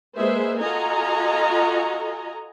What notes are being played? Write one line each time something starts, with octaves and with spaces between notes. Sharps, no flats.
G#3 A#3 G#4 B4 C5 E5
F4 F#4 A4 D#5 G#5 A#5